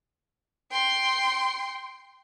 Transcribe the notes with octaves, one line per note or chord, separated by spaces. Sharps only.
G5 C6